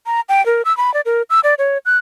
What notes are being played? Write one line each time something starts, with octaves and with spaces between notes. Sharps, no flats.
A#5
G5
A#4
E6
B5
D5
A#4
E6
D5
C#5
F#6